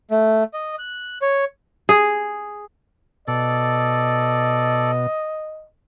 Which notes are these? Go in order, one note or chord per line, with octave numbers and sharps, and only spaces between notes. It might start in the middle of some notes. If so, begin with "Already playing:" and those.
A3
D#5
F#6
C#5
G#4
B2 A4 D5 D#5